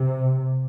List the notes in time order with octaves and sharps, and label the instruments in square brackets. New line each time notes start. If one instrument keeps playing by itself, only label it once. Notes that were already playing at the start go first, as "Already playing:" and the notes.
Already playing: [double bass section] C3